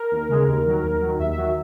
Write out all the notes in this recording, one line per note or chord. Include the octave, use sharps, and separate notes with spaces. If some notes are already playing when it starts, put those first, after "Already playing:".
Already playing: A#4
D#2
C#3 G#3
D#2
D#3 F#3
D#2
D#3 F#3
D#2 E5
E5
D#3 F#3
E5